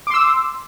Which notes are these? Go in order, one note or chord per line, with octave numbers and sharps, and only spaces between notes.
C6 D6 E6